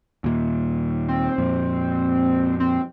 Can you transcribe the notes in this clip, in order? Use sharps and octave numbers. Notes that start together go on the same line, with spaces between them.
D#2 A#2
C4
F2 A#2
C4